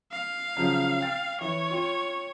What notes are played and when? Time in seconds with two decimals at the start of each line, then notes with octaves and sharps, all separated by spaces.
0.11 F5
0.57 C#3 F3 F#3
1.01 G5 F6 A6
1.41 E3 C#5
1.71 F4 G5